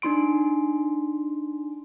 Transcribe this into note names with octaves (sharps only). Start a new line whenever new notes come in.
D4 D#4 C6 D7